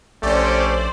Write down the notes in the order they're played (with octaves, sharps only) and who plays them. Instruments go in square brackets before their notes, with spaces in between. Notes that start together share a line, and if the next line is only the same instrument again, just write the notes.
[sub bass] A#1 [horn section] A3 C#4 G4 [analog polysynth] C5 D5